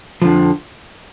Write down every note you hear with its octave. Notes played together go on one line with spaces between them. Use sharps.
F2 D3 F3